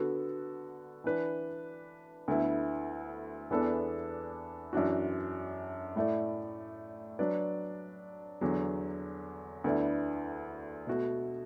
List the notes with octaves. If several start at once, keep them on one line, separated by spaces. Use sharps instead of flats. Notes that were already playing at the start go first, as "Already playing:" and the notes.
Already playing: D3 B3 F#4 A4
E3 D4 B4
D2 D3 B3 E4
E2 E3 B3 D4 A4
F#2 E3 D4 F#4
A2 A3 E4 D5
F#3 D4 B4 D5
E2 D3 F#3
D2 D3 B3 E4 D5
B2 A3 F#4